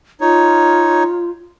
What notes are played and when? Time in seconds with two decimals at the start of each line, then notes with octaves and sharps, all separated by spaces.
0.21 D#4 F4 C#5